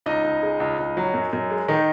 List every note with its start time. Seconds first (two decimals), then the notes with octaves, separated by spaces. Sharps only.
0.06 C#2 D#4 D#5
0.24 C#2
0.42 G#3
0.60 C#2
0.79 C#2
0.97 F#3
1.14 F#2
1.33 F#2
1.50 G#3
1.68 D#3 D#4